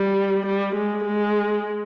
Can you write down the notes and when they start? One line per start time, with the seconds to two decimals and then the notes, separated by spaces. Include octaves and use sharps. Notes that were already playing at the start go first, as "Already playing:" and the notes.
Already playing: G3
0.46 G3
0.75 G#3
1.05 G#3